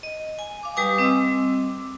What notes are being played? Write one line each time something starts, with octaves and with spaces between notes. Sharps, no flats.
D#5
G#5
F5 D6
G3 G4 B4 G#5 D6 D#6
G3 C4 D#5 D6 E6